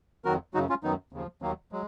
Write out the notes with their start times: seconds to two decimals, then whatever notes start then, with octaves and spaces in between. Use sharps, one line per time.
0.25 F2 D#3 F#3 F#4 A#4
0.54 F#2 C#3 F#3 D#4 F#4
0.69 C#4 F4
0.83 F#2 D#3 F#3 B3 D#4
1.13 D#2 C#3 F3
1.42 D#2 D#3 F#3 A#3
1.72 F#3 G#3